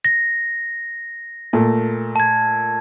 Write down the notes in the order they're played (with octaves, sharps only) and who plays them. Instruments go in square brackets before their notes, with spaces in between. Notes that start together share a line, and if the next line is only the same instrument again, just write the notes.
[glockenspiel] A#6
[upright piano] A#2 A3
[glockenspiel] A5 G#6